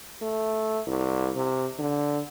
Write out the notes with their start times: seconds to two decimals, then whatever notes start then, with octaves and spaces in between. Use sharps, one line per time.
0.22 A3
0.87 C2
1.36 C3
1.79 D3